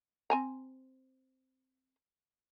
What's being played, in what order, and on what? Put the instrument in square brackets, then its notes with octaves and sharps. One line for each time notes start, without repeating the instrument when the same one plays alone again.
[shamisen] C4 G#5 A#5